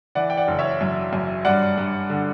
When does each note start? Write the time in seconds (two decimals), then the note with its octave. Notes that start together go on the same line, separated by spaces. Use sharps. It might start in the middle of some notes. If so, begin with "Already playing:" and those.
0.15 E3 D5 F#5
0.30 G5
0.37 D5 F#5
0.48 F#1
0.59 C#5 E5
0.81 F#2
1.13 F#2
1.45 G2 D5 F#5
1.78 G2
2.10 D3